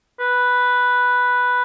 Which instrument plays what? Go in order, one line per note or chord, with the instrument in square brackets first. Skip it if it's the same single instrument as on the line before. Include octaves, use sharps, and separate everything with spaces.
[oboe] B4